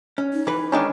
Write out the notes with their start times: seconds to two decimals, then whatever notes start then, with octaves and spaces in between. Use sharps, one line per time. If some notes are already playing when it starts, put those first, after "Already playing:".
0.18 C#4
0.33 D#4
0.47 E3 B4
0.72 D#3 G#3 C#4 D4